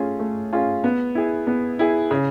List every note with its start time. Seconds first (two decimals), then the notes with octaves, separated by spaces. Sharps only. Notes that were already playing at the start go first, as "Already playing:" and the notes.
Already playing: A3 C#4 F4 G#4
0.20 A3
0.52 C#4 F4 G#4
0.84 B3
1.15 E4 G#4
1.47 B3
1.79 E4 G#4
2.11 C#3